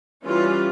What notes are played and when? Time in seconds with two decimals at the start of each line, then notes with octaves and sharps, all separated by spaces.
0.25 E3 G3 C#4 F4